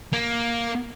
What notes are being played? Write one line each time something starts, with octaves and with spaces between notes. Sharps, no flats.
A#3